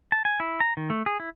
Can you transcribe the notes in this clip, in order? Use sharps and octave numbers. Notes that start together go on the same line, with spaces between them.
A5
G#5
E4
A#5
D#3
A3
G#4
E4